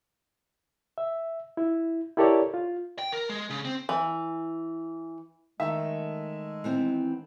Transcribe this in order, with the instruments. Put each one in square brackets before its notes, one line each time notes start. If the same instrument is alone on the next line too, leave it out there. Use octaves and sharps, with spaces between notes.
[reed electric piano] E5
E4
E4 G4 A4 A#4 C#5 D5
F4
[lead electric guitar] G5
A#4
G#3
C#3
C4
[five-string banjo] E3
[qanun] D#3 A3 [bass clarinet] G#3 [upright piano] E5
[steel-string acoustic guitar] E3 B3 C4